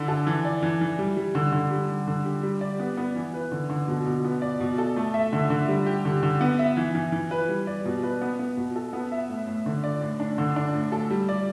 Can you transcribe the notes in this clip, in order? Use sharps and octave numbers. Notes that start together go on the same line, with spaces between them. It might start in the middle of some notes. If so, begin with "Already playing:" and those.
Already playing: D3 E4
A4
E3
D5
E3
E3
G3
G3
D3
D3
G3
G3
D3
G4
G3
D5
B3
B3
E3
B4
D3
D3
B2
B2
B3
D5
B2
A4
A3
E5
D3
D3
G3
G4
D3
D3
B3
E5
E3
E3
E3
B4
G3
D5
B2
B4
B3
B3
B2
A4
B3
E5
A2
A2
D3
D5
A2
D4
D3
D4
A2
A4
G3
D5